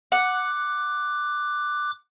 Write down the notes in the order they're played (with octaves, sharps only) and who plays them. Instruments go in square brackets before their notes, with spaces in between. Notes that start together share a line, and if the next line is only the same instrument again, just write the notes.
[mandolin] F#5 [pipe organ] D6 F#6